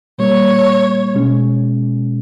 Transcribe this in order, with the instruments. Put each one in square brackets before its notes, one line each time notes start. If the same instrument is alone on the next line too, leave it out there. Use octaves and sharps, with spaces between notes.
[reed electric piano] A#2 G3 A#3 [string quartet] C#5
[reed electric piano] B2 G#3 C#4